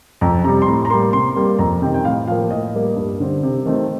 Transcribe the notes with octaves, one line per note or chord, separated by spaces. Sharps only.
F2 A#5
C3 G3 A#5
C6
A2 A#5
A#5
G3 A#3 C6
C3 C6
G3 A#3
F2 A#5
C3 D#3 G5
G5
A2 F5
F3 A#3 F5
A2 D#5
G3 A#3
G2
D3 G3 C4
C3
D#3 A3 C4